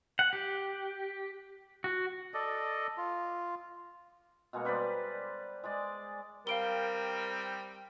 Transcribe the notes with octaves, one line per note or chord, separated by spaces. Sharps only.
F#5
G4
F#4
A4 D5 D#5
F4
B2 G#3 A#3 C#6
G3 B4 C5 D5
G#3 G#4 D5
G3 C4 A#4 F5 D7 G7